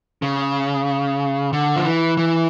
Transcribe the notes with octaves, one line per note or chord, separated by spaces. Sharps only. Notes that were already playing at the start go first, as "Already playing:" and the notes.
C#3
D3
F3
E3
E3